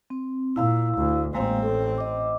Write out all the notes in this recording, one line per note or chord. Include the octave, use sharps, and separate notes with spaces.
C4
A#2 E4 F5 E6
D2
A1 G#3 A#3 C4 F5
A4
D#5 D6